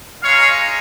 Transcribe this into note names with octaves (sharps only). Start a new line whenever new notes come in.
G#3 D#4 C#5 F5